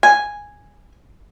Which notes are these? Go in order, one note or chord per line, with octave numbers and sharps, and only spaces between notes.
G#5